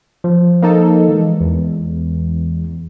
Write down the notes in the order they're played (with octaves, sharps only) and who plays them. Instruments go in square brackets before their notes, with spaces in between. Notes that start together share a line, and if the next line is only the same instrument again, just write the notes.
[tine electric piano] F3
[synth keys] A#3 D#4 A4
[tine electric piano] E3 G#3
[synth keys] E2